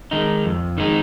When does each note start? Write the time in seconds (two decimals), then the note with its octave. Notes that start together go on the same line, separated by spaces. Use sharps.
0.11 D#3 G#3 D#4
0.45 F2
0.78 D#3 G#3 D#4